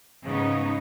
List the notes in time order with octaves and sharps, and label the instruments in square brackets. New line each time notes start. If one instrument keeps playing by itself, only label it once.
[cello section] G#2 C#3 B3 D#4